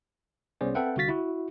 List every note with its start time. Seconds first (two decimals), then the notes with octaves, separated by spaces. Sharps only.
0.61 C2 B3 C#4 G#4 C5 D5
0.75 C4 A4 B4 E5 F#5 G5
0.96 C2 D3 F#4 F5 A6 B6
1.09 E4 F#4